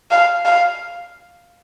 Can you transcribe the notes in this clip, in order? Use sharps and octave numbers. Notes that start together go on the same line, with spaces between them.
F5
F5